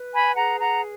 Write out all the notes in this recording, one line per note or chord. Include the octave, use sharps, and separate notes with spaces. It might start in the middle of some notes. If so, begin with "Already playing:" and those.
Already playing: B4
G#5 B5
G#4 F#5 A#5
F#5 A#5